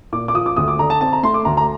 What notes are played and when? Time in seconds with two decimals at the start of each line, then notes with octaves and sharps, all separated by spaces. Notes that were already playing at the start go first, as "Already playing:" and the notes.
0.12 A#2 D6
0.28 D6
0.35 F3 D#6
0.46 D6
0.57 D2 D#6
0.68 D6
0.79 D3 A#5
0.90 A5
1.01 C4 A5
1.13 A#5
1.23 A3 C6
1.34 D6
1.45 D2 A#5
1.57 A#5